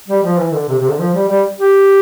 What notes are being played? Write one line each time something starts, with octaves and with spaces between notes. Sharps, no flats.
G3
F3
E3
D3
C3
C3
D3
F3
G3
G3
G4